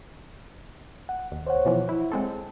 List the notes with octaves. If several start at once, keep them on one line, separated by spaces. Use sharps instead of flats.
F#5
D#2
C5 C#5 F#5
B2 E3 F3
E4
G#3 C4 A4